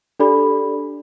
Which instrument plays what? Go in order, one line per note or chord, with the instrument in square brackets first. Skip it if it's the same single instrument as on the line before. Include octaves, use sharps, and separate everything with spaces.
[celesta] D4 G4 A4 D5 B5